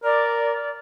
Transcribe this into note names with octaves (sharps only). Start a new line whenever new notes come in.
A#4 D5